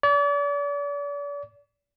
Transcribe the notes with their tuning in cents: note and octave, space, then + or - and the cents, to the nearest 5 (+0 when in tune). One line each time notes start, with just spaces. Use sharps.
D5 -40